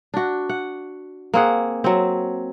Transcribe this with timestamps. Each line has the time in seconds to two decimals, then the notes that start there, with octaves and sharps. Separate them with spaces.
0.14 D4 F#4
0.49 F#5
1.34 A#3 C4 G#4 F#5
1.84 F#3 C4